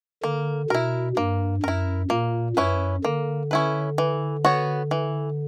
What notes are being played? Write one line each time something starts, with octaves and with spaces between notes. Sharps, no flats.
D3 A#3
B2 E4 A#4
G2 A#3
F#2 E4 A#4
A#2 A#3
F#2 C#4 E4 B4
D3 A#3
C#4 E4 B4
E3
B3 F#4 C#5
E3